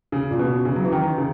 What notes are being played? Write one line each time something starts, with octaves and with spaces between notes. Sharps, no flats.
C#3
A#2
B2
C#3
F#3
E3
D#3
C#3